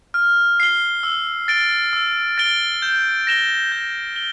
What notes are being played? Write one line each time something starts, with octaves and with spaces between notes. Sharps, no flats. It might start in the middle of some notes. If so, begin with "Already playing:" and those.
F6
C7 G7
E6
A6 D7 G7
E6
A6 D7 G7
G6
A#6 E7 G7
G6
G7